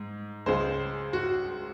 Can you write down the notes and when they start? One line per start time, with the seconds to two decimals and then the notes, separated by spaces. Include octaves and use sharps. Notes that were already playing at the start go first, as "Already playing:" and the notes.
Already playing: G#2
0.46 C#2 C#3 G#3 C5
1.13 F#4